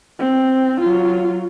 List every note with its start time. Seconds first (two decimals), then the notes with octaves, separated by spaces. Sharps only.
0.19 C4
0.81 F#3 F4